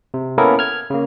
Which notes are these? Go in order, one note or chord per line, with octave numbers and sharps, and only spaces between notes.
C3
A#3 B3 C#4 E4 A4 A#4
F6 G#6
C#3 A#3